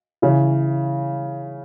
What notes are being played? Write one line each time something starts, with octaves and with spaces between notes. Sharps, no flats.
C#3 E3